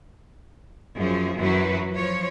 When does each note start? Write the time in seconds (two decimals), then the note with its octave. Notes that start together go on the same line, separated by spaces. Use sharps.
0.97 F#2 F3 G#4
1.38 F#2 E3 F#3 F#4 B4
1.94 F3 C#5